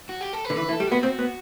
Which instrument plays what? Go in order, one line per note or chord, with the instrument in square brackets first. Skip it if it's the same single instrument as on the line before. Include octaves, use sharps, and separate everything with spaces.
[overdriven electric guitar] F#4
G4
A4
B4
[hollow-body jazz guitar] D3
[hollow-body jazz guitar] E3 [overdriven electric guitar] B4
[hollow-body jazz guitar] E3
[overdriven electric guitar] A4
[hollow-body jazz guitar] G3
[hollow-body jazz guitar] B3 [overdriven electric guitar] F#4
[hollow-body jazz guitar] C4
B3